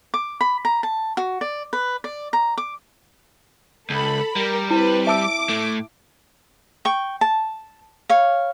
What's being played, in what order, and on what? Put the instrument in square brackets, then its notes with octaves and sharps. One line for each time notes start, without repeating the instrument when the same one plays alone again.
[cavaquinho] D6
B5
A#5
A5
F#4
D5
B4
D5
A#5
D6
[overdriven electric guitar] C#2 [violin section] A4 B5
[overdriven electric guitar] G3 [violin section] A#4
[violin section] C4 B4 [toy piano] E4
[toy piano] E5 A5 E6 [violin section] D6
[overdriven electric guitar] A2 A3
[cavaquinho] G5 C#6
A5
C#5 F5